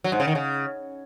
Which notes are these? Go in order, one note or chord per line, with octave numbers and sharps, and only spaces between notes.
F#3
G#2
C#3
D#3
C#3